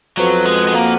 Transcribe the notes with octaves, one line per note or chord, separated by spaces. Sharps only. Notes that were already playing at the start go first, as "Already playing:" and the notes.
F2 F3 F#3 B3 F#4 B4
G#3
G#3
A#3